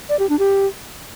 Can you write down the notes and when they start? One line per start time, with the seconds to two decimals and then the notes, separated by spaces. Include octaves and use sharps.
0.10 D5
0.19 G4
0.29 D4
0.39 G4